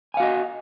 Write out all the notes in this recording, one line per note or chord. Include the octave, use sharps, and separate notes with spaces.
F#4 D#5 F5 G#5